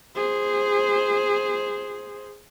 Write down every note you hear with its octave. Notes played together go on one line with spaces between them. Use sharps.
G#4 C5